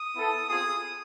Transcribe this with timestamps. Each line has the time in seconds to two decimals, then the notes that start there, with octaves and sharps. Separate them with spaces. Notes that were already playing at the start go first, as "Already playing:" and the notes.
Already playing: D#6
0.15 B3 E4 A4
0.49 C4 F4 G#4 D#6